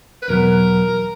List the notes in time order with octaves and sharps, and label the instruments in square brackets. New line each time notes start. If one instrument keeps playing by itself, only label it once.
[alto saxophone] B4
[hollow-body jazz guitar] E2 B2 F#3 [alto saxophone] A#4